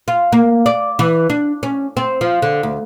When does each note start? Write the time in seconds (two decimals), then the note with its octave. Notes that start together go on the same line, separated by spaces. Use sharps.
0.08 F4
0.32 A#3
0.66 D5
0.99 E3
1.30 D4
1.63 C#4
1.97 C4
2.21 F3
2.42 D3
2.63 D2